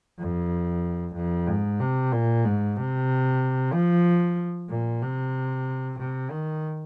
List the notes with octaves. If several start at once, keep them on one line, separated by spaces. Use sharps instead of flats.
F2
F2
G#2
C3
A#2
G#2
C3
F3
A#2
C3
C3
D#3